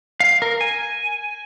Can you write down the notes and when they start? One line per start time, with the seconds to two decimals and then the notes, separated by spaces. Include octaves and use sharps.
0.20 F5
0.42 A#4
0.61 G#5